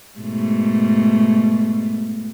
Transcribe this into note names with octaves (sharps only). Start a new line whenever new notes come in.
G#2 B2 A3